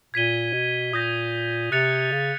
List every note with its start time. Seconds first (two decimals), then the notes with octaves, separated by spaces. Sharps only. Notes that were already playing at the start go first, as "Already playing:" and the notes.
0.14 A#2 G#6 B6 D#7 G7
0.53 B2
0.93 A#2 D#6 G6 A#6
1.72 C3 F#6 A6 C#7 F7
2.12 C#3